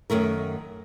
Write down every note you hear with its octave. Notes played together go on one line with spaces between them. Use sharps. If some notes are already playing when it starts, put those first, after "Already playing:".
F#2 D#3 A3 A#4